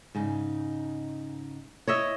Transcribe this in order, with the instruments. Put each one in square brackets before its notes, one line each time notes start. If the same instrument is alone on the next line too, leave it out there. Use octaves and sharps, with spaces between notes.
[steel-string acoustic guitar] G#2 C#3 D#4
[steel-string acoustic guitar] E4 [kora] C#5 D#5 E5